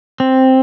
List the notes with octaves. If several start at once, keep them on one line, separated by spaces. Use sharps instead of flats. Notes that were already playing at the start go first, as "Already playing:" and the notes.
C4